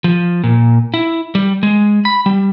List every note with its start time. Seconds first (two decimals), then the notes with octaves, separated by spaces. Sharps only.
0.04 F3
0.44 A#2
0.94 E4
1.35 G3
1.63 G#3
2.05 B5
2.26 G3